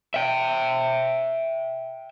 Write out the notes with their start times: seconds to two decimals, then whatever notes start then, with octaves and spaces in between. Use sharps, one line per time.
0.14 E5 G5